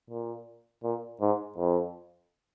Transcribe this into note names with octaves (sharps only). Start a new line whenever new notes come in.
A#2
A#2
G#2
F2